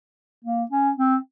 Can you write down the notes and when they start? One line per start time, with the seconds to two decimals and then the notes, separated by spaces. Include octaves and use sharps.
0.45 A#3
0.71 C#4
0.97 C4